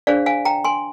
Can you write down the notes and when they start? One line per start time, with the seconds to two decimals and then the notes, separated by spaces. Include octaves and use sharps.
0.07 D4 G#4 C5 D5 F5
0.26 F5 G#5
0.45 G5 A#5
0.64 G#5 C6